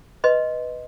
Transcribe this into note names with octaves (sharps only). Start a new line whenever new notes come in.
B4 D#5 C6